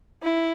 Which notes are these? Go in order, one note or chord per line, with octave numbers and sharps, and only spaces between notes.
E4